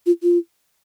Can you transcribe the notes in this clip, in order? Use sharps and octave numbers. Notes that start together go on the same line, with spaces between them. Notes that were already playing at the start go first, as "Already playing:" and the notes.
F4
F4